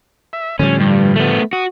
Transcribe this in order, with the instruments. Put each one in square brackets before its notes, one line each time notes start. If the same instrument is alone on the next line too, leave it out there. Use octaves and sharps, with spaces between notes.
[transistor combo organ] E5
[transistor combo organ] A2 F3 [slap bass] D3 G3 [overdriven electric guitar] C#4
[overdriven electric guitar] G2
A3 B3
[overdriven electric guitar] F#4 [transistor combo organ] D#6